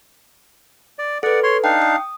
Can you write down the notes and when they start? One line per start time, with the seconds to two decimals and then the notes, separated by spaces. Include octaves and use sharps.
0.99 D5
1.23 A4 B4 D5 F#5
1.43 C#5 C6
1.64 D4 D#4 F5 G5
1.82 D#6